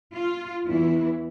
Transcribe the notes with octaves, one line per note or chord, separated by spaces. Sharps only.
F4
E2 E3 E4